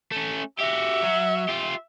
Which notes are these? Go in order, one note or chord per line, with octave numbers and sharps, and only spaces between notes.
A3 C#4
F#4 G4 E5
F#3
F4 G4